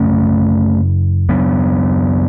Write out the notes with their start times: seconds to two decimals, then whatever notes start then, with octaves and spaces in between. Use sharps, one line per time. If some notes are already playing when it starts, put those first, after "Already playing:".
Already playing: F#2 C#3 A3 C#4
1.29 F#2 C#3 F#3 B3